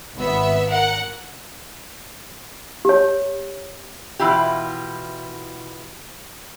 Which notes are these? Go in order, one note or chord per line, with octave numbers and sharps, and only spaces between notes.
G#1 B3 E5
A#4 F#5
G4 C#5
B2 E3 E4 F4 G4